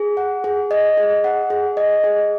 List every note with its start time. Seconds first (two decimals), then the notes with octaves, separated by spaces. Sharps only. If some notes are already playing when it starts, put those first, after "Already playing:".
Already playing: G#4
0.17 F#5
0.44 G#4
0.71 D#5
0.97 G#4
1.24 F#5
1.50 G#4
1.77 D#5
2.04 G#4